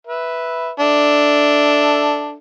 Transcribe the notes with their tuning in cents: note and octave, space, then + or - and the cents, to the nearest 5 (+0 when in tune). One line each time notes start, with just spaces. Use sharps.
B4 +0 E5 -5
D4 +0 A4 +0 E5 +0